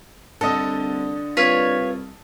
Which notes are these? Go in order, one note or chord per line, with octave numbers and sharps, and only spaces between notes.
C2 D3 A4 D#5
C2 F4 B4 C#5